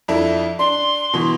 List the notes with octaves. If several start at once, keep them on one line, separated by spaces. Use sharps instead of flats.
F2 D4 E4
D4 C6
B2 E3